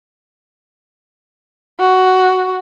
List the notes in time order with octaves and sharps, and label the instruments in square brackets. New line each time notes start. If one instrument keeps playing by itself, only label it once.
[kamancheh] F#4